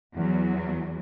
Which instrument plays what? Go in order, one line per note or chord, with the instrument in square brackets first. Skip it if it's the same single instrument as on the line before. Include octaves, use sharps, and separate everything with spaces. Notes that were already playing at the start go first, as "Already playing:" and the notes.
[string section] E2 F#3